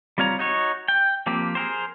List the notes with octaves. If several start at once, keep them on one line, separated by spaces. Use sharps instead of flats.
G3 C4 F4 C#5 A#5
D#4 F#4 C#5
G5
F3 A#3 C4 G4
G#4 A#4 C5